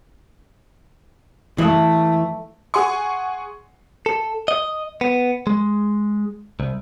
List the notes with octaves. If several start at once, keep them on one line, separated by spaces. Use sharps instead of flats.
E3 A3
G#4 F#5 G#5 C6 C#6
A4
D#5
B3
G#3
C2